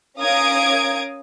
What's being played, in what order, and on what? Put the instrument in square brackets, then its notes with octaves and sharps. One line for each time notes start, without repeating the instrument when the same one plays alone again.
[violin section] C#4 A#4 F5 D#6 G#6 D7